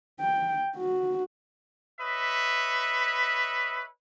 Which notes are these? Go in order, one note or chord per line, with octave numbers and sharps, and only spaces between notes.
G5
F#4
B4 C#5 D#5 E5